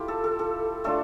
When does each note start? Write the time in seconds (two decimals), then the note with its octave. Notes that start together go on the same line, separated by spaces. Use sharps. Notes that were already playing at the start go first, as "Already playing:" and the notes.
Already playing: A3 E4 F4 G4
0.08 A4
0.24 A4
0.39 A4
0.84 A3 D4 F4 A4